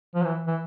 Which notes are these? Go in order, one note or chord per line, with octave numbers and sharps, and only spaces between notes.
F3
E3
E3